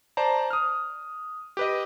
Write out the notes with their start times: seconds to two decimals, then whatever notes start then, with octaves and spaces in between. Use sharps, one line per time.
0.17 C5 D5 A5 A#5
0.50 D#6 F6
1.57 G4 B4 D#5